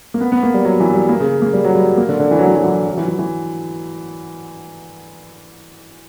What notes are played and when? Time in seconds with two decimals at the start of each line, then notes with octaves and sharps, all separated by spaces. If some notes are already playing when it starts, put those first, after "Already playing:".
0.14 A#3
0.20 B3
0.32 B3
0.43 A#3
0.54 G3
0.65 F#3
0.80 E3
0.94 G3
1.09 A#3
1.20 C#3
1.42 A#3
1.53 G3
1.64 F#3
1.75 G3
1.98 A#3
2.09 D3
2.20 D3
2.31 E3
2.39 F#3
2.48 E3
2.56 F#3
2.64 E3
2.86 F#3
2.97 E3
3.08 E3
3.19 E3